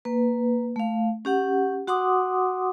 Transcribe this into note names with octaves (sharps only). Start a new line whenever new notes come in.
A#3 B4
A3 F5
C#4 G4 F#5
F#4 F#5 C6 D6 D#6